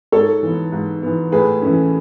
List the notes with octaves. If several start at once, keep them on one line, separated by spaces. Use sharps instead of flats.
G#2 A4 C#5
E3 B3
G#2
E3 B3
A2 G#4 B4
E3 A3 C#4